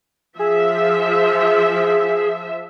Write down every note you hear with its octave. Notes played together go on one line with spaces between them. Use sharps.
F3 G#4 E5